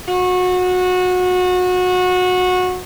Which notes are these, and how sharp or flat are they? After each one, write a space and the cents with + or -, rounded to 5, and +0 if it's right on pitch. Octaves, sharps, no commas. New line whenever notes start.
F#4 -25